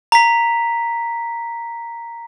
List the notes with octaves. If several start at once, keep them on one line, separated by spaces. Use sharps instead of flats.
A#5 B6